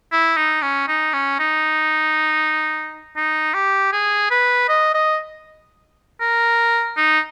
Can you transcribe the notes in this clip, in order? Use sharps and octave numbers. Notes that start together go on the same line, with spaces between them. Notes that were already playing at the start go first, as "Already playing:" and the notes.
E4
D#4
C#4
D#4
C#4
D#4
D#4
G4
G#4
B4
D#5
D#5
A#4
D#4